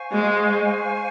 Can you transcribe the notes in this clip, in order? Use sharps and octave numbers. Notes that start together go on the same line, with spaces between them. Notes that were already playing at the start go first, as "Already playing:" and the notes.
Already playing: C5 F5 G#5 C#6
G#3